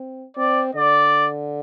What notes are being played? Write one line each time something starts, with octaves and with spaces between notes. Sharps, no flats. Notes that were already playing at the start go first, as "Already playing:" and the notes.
Already playing: C4
C4 D5
D3 D5